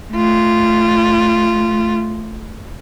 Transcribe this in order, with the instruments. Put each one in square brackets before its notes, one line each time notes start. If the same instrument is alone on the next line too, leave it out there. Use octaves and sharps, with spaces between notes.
[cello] A3 F4